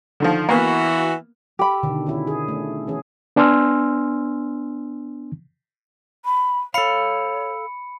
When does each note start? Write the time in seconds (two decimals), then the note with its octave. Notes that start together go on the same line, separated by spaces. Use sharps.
0.20 D3 D#3 F3
0.49 E3 A#3 B3 F#4
1.59 G4 A4 B5
1.83 B2 D3 D#3
2.06 D#3 C#4 E4
2.27 G#4
2.48 A3
2.87 E3 C#4 G#4
3.36 B3 D4 G#5 C6 E6 F6
6.25 B5
6.74 A4 C#5 F5 B5 C#7